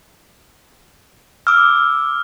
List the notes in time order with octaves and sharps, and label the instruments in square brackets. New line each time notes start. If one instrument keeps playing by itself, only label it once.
[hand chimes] D6 E6 [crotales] F6